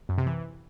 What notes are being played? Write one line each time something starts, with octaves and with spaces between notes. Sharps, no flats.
F#2
C3
E3